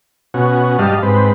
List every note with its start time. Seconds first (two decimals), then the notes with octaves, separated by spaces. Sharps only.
0.34 B2 C#4 F#4
0.79 G2 G3 D#5 F5 A5
1.02 G#2 C4 B4